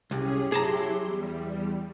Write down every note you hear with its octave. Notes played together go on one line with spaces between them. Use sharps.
C2 F#2 C#4 G4 G#4
F#3 E4 G#4 A5 A#5 C6
E2 G3